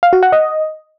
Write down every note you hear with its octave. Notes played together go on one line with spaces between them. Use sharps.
F5
F#4
F#5
D#5